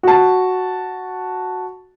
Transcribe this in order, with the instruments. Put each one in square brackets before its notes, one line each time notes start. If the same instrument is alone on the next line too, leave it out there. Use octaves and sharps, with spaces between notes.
[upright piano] F#4 A5